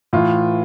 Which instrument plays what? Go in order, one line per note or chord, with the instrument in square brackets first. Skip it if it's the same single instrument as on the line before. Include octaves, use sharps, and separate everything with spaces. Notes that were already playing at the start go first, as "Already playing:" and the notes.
[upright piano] A2 E3 F4